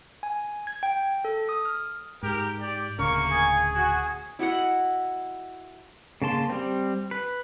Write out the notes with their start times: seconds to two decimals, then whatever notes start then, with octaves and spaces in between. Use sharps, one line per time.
0.23 G#5
0.67 G#6
0.83 G5
1.25 A4
1.49 D#6
1.65 F6
2.23 G#2 G4 A#4
2.61 G4 D5
2.99 D1 D2 C#3 A#3 A#4 C#6
3.31 G#4 G#5
3.75 F#4
4.39 E4 F#4 D#5 F#5
6.22 C#3 A#3 A5 C6
6.50 G3 C4
7.11 B4